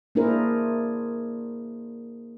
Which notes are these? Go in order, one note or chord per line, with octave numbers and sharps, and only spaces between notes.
A#3 D4 E4 G#4 A#4 C5